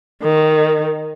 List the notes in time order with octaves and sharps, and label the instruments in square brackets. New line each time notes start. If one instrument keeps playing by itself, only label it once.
[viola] D#3